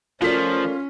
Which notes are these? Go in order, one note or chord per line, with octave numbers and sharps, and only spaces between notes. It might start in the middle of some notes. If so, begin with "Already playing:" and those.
F3 A3 C#4 F4 A#4 D5 B6